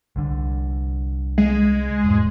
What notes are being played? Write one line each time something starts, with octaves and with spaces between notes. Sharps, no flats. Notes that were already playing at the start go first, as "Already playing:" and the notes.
C2 D3
G#3
E1 G#2